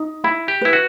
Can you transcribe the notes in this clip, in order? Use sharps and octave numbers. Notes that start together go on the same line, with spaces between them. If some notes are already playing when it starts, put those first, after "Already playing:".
Already playing: D#4
E4 B5
G4
E4 B4
F#4